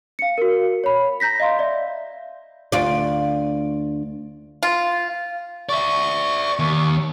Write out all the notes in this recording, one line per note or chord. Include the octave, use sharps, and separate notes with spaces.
F5 C#7
F#4 A#4
C#5 B5
A#5 G6 A#6 B6
D#5 F5 C6
D5 E5
D2 F4 D5
F4
D5 E5 C#6
D#2